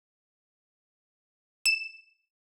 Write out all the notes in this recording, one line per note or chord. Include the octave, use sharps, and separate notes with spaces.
E7